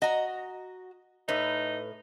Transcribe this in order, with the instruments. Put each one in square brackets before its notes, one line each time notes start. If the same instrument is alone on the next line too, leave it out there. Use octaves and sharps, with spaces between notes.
[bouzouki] F#4 A#5 [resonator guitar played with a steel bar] D#5
[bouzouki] A2 [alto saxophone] D#4 [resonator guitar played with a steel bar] B4